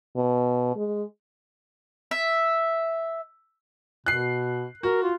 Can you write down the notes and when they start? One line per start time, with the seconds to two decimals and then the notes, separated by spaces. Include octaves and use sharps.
0.16 B2
0.76 G#3
2.11 E5
4.06 B2 F#6 C7
4.83 F#4 A#4
5.03 F4